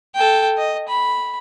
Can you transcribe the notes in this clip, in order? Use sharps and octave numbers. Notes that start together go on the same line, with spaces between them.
A4 G5
D#5
B5